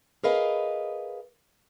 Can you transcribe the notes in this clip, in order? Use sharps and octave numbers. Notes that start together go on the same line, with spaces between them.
G#4 A#4 B4 D#5 F5